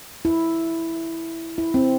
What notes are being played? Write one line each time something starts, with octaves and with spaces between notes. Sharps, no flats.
E4
E4
C4